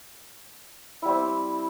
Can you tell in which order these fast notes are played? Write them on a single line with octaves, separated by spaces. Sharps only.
E4 G3 C4